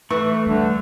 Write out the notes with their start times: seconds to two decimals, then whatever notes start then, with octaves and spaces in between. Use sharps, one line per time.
0.10 E3 A3 C#6
0.46 D3 G3